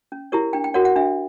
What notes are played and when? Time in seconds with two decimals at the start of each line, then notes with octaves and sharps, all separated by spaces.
0.12 C#4
0.32 E4 G4 A#4 C#5
0.53 D4 G5
0.64 G5
0.74 F#4 A#4 C#5 F#5
0.85 F#5
0.96 D4 E5